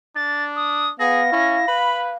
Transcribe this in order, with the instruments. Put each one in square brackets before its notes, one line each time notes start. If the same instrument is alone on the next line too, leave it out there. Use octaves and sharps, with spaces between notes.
[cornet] D4 [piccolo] A6
[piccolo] D#6
[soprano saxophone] B3 [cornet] G#4 [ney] F5 [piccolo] A#6
[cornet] C#4 [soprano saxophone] E4
[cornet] B4 [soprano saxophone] B5